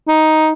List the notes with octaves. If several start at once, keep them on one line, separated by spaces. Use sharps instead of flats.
D#4